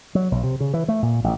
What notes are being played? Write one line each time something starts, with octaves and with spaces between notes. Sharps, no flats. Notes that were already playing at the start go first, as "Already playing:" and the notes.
F#3
B1
C3
C#3
E3
A3
A#2
A1